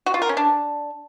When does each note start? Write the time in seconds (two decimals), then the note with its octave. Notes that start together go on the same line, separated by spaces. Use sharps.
0.06 F#4
0.14 F4
0.22 A#4
0.29 C#4
0.37 D4